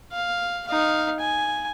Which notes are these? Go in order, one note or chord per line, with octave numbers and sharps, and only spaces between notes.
F5
D#4 F5
G#5